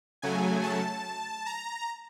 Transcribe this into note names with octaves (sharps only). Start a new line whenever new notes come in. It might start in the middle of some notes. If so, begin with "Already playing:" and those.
C#3 F#3 A3 G#5
A5
A#5